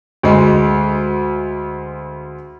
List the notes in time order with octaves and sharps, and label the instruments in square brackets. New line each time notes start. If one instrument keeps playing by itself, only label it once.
[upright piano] D2 G#3